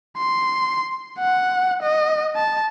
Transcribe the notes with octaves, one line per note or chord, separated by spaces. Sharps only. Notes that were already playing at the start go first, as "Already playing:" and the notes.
C6
F#5
D#5
A5